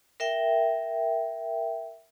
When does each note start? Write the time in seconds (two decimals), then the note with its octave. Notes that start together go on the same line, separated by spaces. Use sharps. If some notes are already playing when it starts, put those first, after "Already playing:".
0.20 A#4 E5 G5